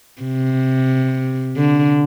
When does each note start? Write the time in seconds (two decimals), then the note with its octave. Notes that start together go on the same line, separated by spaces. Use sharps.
0.22 C3
1.56 D3